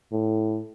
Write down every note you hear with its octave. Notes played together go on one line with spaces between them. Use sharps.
A2